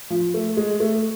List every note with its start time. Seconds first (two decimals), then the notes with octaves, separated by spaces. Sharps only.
0.10 F3
0.34 A3
0.57 G#3
0.80 A3